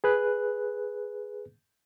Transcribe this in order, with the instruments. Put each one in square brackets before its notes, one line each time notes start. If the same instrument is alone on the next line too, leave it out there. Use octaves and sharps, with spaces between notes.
[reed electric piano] G#4 B4 F#6